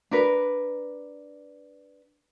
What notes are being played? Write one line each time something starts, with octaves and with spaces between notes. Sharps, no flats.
D4 A#4 B4